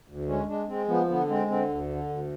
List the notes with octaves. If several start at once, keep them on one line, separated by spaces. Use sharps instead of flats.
D2
G#3 C#4
G#3 D4
G#3 C4
F3 B3
D3 B3
G#3 C4
D3 C4
D2
D3
D2